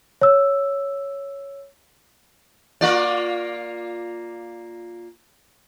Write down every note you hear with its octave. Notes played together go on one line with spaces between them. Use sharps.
C#5 E6
A#3 F4 D5